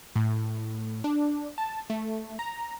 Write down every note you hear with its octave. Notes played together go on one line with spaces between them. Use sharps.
A2
D4
A5
A3
A#5